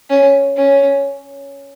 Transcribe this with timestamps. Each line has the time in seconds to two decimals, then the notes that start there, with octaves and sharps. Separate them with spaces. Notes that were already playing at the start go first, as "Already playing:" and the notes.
0.10 C#4
0.57 C#4